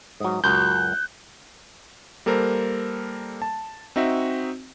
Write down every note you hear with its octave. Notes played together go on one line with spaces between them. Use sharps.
G#2 F#3 D#6
C#2 F#2 F#3 F#6 G6
G3 A#3 A4 A#4 C5
A5
C4 D#4 F#4 E5